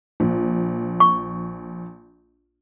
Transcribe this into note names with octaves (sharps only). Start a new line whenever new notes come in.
A#1
C#6